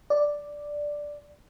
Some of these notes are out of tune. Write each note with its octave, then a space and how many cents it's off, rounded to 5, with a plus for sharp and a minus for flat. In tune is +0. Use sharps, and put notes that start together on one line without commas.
D5 +0